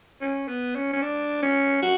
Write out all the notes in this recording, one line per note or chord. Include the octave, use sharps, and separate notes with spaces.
C#4
B3
C#4
C#4
D4
C#4
F#4